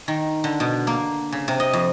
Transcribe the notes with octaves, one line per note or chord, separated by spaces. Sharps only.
D#3
D3
B2
A#3
C#3
C3
D#5
F2